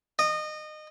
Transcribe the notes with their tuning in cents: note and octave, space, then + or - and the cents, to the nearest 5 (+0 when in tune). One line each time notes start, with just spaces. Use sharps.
D#5 -25